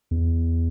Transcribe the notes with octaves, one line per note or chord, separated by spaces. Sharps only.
E2